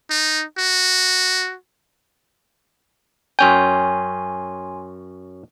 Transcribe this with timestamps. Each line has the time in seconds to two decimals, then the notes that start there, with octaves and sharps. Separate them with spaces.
0.10 D#4
0.58 F#4
3.39 F#2 C#4 G5 G#5 C6